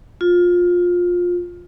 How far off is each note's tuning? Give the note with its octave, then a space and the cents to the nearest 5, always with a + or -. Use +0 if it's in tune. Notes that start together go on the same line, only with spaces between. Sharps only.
F4 +20